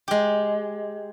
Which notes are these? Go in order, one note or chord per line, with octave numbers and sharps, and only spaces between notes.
G#3 G4